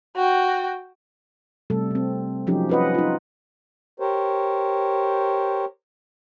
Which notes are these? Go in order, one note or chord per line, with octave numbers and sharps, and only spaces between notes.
F#4 G5
C3 G3 A3 A4
C3 C4
F3 F#3 C#4 D#4 G4
C#4 F4 B4 D#5 F#5
D#4 F4
G4 A#4 C5 C#5